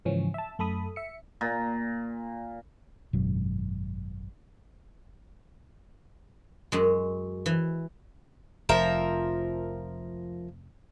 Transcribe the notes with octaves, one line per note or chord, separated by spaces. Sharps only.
G#2 C#3 E3 F3 C#4
E5 A5
F#2 A3 A4 B5 D#6
E5 C#7
A#2
G#1 F#2 B2 F#3
F#2 G#3
E3
F1 F3 A#4 E5